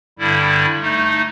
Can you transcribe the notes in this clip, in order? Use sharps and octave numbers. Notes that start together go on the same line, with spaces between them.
G2 D3 G3 E4
A3 D#4